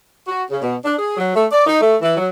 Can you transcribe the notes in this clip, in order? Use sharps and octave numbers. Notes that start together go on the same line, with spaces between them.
F#4
C#3
B2
D4
G#4
F#3
A3
D5
D#4
A3
E3
F#3